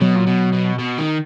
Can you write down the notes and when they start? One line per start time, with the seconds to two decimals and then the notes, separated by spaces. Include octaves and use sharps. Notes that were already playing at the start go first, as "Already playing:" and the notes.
0.01 B2 F#3
0.16 A#2
0.27 B2
0.53 B2
0.79 B2
0.98 D#3